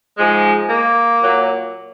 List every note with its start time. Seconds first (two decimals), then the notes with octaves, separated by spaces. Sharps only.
0.18 G#2 F3 G#3
0.68 A#3
1.20 A#2 F#3